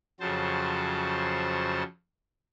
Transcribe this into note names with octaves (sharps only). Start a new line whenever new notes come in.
F2 C#3 F#3 C5 A5